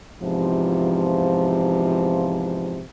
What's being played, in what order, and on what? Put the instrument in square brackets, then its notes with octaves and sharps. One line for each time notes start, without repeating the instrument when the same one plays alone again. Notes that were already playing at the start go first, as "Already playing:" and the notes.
[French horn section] E2 G#2 C3 F3